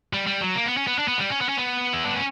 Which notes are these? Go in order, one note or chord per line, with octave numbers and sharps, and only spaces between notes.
G3
G3
F#3
A#3
B3
C#4
B3
D4
B3
G3
C#4
B3
C#4
B3
E4
D4
C#4